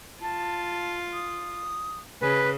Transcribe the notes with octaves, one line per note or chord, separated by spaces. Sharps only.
F4 A5
D#6
C#3 B4 G#5